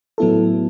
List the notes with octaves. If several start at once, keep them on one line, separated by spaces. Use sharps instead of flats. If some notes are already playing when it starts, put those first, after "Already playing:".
A2 F#3 B3 E4 A4